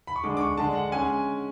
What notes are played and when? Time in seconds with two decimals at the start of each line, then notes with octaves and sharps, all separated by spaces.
0.07 B5
0.16 C#6
0.24 D3 G#3 D4 D6
0.37 D6
0.41 C#6
0.57 D3 G#3 D4 A5
0.75 F#5
0.92 G#3 C#4 G#5